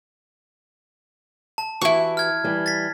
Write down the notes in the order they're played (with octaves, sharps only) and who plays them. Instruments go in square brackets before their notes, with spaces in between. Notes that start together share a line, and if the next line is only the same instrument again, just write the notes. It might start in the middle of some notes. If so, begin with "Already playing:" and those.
[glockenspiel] A5
[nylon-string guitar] E3 F#4 G4 [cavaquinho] E4 C#6
[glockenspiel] F6 G#6
[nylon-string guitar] E3 G3
[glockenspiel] A6 B6